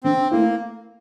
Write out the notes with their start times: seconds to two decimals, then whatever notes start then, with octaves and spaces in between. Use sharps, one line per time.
0.04 D3 C4
0.31 A3 A#3 E4